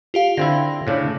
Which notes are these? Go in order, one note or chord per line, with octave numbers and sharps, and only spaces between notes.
F4 G4 F5
D3 C4 E4 A#6
A2 C#3 D4